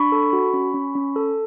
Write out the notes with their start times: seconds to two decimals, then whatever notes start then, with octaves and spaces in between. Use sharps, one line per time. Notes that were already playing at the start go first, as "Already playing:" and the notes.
Already playing: D4 B5 C#6
0.12 A4
0.33 F#4
0.54 C#4
0.74 C#4
0.95 C#4
1.16 A4